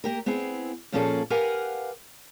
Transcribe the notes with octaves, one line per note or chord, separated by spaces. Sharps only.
A#3 G4 A#4
B3 C4 E4 G#4
A#2 F3 A#3 C#4 G#4 A4
G4 A#4 B4 F5 F#5 G#5